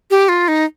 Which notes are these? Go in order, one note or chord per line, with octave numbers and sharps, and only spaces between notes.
G4
F4
D#4